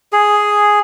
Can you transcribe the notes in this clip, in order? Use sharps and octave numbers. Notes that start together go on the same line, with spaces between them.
G#4